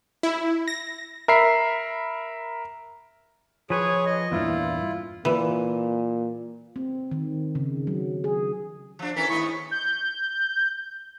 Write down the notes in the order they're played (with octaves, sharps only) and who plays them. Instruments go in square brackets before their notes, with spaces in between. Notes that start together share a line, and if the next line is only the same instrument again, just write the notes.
[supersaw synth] E4
A#6
[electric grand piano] A#4 E5 B5 C7
[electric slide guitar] F3 B4 [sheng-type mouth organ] G#4 C#5
[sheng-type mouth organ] D#5
[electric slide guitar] E2 G2 A#2 [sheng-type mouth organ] E4 F4
[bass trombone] A#2 [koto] E3
[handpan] C4
D#3
C#3
F#3
G#4
[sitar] F3 D4
[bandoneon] E3 [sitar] C#4 A4 A#4 [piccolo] B6
[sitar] D#2 G#2 D#5 [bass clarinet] E4 [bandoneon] C#6
[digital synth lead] G6